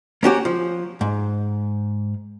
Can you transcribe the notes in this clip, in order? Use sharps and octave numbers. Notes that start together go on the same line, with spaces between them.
A#3 C#4 F#4 G4
F3
G#2